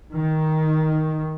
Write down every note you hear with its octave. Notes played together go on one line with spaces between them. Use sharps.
D#3